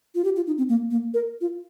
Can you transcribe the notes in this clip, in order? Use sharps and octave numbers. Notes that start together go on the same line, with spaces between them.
F4
G4
F4
D#4
C4
A#3
A#3
A#4
F4